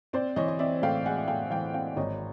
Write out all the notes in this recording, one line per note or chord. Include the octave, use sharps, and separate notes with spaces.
C4 C5 D5
E3 C#5 D#5
D#5
C4 D5 E5
A2 F5 G5
G#3 F#5 G#5
A2 F5 G5
E3 F5 G5
C4 F5 G5
G#1 C#5 D#5